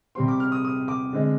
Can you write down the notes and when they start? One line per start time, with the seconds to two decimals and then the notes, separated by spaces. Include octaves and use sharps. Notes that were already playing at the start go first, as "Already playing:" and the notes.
0.15 C3 G3 C4 C6
0.28 D6
0.40 F6
0.52 D#6
0.65 D#6
0.88 D6
1.13 D3 G#3 C4